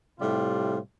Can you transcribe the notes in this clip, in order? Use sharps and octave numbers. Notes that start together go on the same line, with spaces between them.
A2 C3 G3 F4